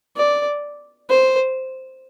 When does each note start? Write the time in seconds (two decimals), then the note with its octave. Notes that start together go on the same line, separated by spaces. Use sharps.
0.17 D5
1.10 C5